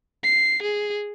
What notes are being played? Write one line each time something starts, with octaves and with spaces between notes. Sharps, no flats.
C7
G#4